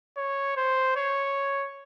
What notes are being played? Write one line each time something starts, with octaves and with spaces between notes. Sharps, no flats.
C#5
C5
C#5